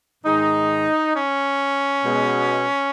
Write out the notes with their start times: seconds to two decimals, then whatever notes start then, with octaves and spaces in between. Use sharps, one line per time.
0.24 G#2 D#3 G#3 D#4
1.13 C#4
2.02 B2 G#3